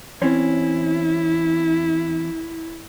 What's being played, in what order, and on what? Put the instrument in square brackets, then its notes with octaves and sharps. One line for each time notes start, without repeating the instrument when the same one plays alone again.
[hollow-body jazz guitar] E2 C4 C#4 [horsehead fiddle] E4